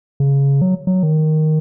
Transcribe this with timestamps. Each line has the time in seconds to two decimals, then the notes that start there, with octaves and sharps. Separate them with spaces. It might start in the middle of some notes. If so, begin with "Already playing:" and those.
0.20 C#3
0.62 F#3
0.87 F#3
1.03 D#3